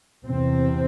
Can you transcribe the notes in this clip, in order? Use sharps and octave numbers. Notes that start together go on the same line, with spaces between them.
E2 C3 C4